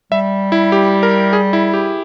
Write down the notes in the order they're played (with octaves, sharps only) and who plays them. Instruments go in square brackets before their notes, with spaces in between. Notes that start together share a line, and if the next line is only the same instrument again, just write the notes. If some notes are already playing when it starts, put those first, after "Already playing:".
[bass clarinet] G3 [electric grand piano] E5
[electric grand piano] E4
G4
A#4
G#4
E4
G4